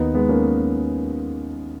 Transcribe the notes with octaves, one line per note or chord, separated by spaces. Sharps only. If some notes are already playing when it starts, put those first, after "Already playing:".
Already playing: D#2 D#3 B3 D#4
G#3 B3
A#3 C#4